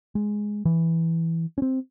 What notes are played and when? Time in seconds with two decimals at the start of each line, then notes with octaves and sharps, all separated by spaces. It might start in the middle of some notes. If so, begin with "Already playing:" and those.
0.15 G#3
0.65 E3
1.58 C4 C#4